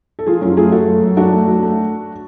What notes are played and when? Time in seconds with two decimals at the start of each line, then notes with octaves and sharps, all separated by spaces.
0.19 A4
0.26 F3 F4 G#4
0.41 F#2 C#4 F4
0.57 A3 F4 G#4
0.72 A3 F#4 A4
0.87 F#2
1.02 F#2
1.17 F#2 D4 F#4
1.32 A3
1.48 F#3
1.62 A3